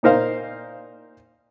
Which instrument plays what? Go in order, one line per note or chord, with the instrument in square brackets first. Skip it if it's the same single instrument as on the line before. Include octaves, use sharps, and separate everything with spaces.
[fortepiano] A#2 D#4 A#4 C5 F5